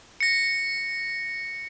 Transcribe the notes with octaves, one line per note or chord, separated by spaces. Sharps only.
A#6 C#7